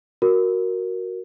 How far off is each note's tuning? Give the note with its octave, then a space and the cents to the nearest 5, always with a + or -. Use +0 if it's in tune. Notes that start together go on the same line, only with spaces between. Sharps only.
F#4 +0 A#4 +0